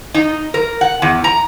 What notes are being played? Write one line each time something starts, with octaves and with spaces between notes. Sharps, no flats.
D#4
A#4
F#5
E2
A#5